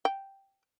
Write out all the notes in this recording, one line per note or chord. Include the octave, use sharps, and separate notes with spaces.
G5